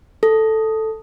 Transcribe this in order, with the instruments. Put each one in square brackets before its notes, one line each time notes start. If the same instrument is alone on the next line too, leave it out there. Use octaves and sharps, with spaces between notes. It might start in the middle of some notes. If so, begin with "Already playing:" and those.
[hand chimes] A4